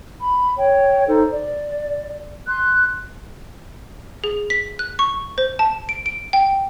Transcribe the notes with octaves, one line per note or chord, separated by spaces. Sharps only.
B5
C#5 G5
D#4 A4 C5
D5
C6 F#6
G#4
B6
F#6
C#6
C5
A5
D7
D7
G5